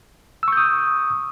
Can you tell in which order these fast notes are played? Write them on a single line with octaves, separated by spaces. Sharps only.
E6 C#6 G6 D#6